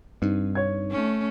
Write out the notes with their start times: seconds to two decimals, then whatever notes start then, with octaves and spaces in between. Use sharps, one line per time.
0.22 G2 C4 D#4
0.55 C#5 G#6
0.91 A3 C#4